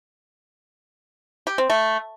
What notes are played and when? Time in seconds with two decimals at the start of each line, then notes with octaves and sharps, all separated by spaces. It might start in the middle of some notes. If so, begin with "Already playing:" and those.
1.47 G4
1.58 C4
1.70 A3